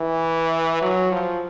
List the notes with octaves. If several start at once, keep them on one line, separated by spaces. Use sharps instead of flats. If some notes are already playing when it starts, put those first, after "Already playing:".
Already playing: E3
F#3
F3